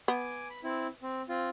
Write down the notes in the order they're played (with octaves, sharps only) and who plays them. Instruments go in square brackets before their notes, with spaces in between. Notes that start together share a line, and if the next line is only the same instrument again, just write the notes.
[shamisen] B3 [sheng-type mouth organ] G#5 D6
[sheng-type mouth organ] B5
C4 E4
C4
C4 F4